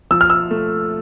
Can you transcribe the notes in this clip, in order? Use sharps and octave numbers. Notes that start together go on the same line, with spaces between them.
F3 E6
F6
E6
A3